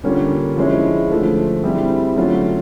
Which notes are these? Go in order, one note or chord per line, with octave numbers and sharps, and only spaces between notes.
D3 G3 A#3 C#4 F4
F3 G#3 C#4 E4
D3 F3 A3
G3 C4 E4 G#4
D3 F#3 A3 C#4 F4